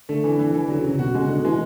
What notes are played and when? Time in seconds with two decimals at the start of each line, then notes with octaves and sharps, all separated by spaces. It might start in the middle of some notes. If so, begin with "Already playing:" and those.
0.09 D3 A3
0.24 E3
0.39 E3
0.54 E3
0.68 D3 F#3
0.84 C#3 F#3
0.99 B2 F#4
1.15 C#3 G#3
1.29 B2 D3
1.45 E3 G#3